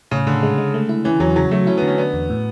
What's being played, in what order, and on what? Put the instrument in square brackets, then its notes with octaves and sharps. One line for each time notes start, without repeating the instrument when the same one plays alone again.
[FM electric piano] A2 [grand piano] C#3
[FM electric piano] A2 [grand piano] D3
[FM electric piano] G#3
G#3
A3
E4
[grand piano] E3 [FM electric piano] C#4
[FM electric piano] E2 [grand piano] F#3
[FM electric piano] C#3 [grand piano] F#3
[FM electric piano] F#3 [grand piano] A3
[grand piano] C#4 [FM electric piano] E4
[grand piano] B3
[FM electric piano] D3
[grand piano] C#4
[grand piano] B3 [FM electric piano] D4
[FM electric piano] E2
A2